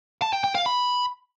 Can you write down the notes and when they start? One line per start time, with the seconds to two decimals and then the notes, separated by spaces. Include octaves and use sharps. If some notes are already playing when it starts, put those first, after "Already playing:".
0.22 A5
0.33 G5
0.44 G5
0.55 F5
0.66 B5